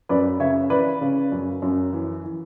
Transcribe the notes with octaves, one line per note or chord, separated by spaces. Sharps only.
F#2 B4 D5
C#3 C#5 E5
E3 B4 D5
C#3
F#2
F#2
E3
E3